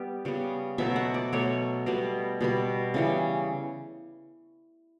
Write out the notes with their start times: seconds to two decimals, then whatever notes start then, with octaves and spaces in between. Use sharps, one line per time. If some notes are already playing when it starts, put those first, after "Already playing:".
Already playing: G3 B3 G4
0.25 C#3 G3 B3
0.78 B2 F#3 A3 E5
0.96 F#5
1.14 D5
1.32 B2 F#3 A3 C#5
1.86 B2 G3 B3
2.41 B2 G3 B3
2.94 C#3 E3 G3